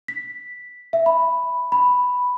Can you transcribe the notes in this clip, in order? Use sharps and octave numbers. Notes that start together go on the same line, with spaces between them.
B6
E5
B5
B5